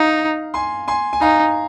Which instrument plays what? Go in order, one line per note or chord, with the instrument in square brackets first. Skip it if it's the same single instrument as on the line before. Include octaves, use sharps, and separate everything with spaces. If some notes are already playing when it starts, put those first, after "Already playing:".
Already playing: [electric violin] D#4 [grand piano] F5 A#5
[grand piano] G#5 C6
G#5 C6
G#5
[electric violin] D#4 [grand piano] F5 A#5